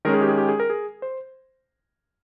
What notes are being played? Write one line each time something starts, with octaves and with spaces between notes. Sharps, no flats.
D#3 G#3 C#4 A#4
G#4
G4
G#4
G4
G#4
A#4
G#4
C5